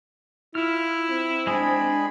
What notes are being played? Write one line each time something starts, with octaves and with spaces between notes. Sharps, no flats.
E4 F4 F6
C4
G#3 D4 G#4 B5